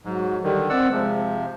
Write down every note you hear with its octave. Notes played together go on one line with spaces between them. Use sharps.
G#2 F#3
D3 D#3 G3
C4 D5 F#5 E6
C3 F3 G#3